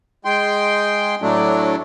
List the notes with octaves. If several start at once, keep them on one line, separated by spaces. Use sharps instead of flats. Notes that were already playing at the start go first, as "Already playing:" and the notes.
G#3 G5 C6
A2 F#3 A3 D4